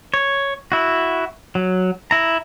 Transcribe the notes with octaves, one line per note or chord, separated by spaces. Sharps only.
C#5
E4 F#4
F#3
E4 A#5